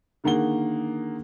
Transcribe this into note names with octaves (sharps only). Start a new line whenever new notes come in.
D3 D#3 A#3 G#4 F#5 G7